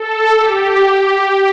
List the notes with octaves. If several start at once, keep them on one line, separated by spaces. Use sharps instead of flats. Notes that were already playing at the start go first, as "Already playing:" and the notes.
Already playing: A4
G4